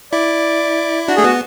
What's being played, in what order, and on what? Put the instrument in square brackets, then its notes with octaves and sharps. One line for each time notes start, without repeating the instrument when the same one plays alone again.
[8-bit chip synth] E4 [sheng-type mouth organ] D5
[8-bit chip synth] D4 [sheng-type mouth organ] F#4
[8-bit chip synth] A3 [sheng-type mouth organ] G#4
[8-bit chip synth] B3 [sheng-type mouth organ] F#4